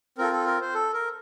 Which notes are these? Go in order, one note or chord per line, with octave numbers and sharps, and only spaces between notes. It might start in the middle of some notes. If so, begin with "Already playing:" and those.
C4 F4 A4 A#4
A4
A#4
C5
A4
A#4